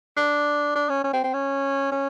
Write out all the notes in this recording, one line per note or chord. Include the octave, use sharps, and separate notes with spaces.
D4
D4
C#4
C#4
C4
C4
C#4
C#4